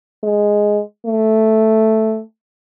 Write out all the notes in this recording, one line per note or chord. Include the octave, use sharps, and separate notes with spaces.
G#3
A3